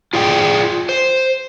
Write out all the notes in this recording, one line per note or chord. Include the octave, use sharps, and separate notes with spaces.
F4 G#4 D5 G5
C5